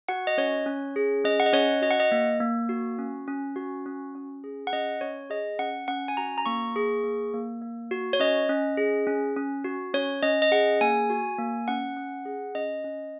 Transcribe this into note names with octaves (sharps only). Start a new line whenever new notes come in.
F#4 F#5
D#5
C#4 C#5
C#4
G#4
C#4 D#5
F#5
D#5
C#4 C#5
F#4 D#5
F#5
D#5
A#3
A#3
F#4
C#4
C#4
F#4
C#4
C#4
G#4
F#5
C#4 D#5
C#4 C#5
G#4 D#5
C#4 F#5
C#4 F#5
G#5
F#4 A#5
A#5
A#3 C#6
G#4
A#3
A#3
A#3
F#4
C#5
C#4 D#5
C#4
G#4
C#4
C#4
F#4
C#4 C#5
C#4 D#5
D#5
G#4 F#5
A#3 G#5
F#4
A#3
C#4 F#5
C#4
G#4
C#4 D#5
C#4